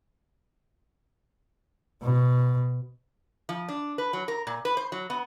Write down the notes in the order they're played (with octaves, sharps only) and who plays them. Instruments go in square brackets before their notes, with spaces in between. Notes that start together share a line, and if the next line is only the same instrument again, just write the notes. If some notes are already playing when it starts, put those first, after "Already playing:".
[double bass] B2
[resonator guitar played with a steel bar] F3
D4
B4
F#3
A#4
A#2
B4
C5
F#3
B3